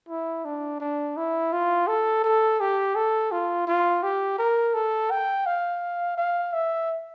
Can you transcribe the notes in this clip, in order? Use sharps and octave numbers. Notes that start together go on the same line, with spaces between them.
E4
D4
D4
E4
F4
A4
A4
G4
A4
F4
F4
G4
A#4
A4
G5
F5
F5
E5